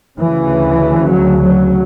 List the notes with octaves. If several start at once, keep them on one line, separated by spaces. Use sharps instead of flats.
D2 C#3 E3
F#3
F#3